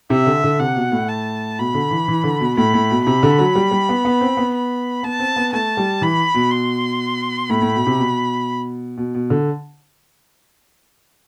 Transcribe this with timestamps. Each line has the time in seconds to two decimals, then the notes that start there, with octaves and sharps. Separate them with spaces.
0.10 C3 E5
0.26 D3
0.44 D3
0.59 C3 F#5
0.76 B2
0.92 A2
1.08 A5
1.59 B2 B5
1.74 D3
1.91 E3
2.08 E3
2.24 D3
2.40 B2
2.57 A2 B5
2.74 A2
2.90 B2
3.06 C3 B5
3.23 D3
3.39 F#3
3.55 G3
3.71 G3
3.89 B3
4.05 B3
4.21 C4
4.37 B3
4.54 B5
5.03 B3 A5
5.19 C4
5.36 B3
5.53 A3 A5
5.77 G3
6.02 E3 B5
6.34 B2
6.51 C6
7.50 A2 B5
7.62 A2
7.75 B2
7.86 C3
7.99 B2
8.97 B2
9.15 B2
9.30 D3